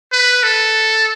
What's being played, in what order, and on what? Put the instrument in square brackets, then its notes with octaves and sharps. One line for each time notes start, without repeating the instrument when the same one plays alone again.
[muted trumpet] B4
A4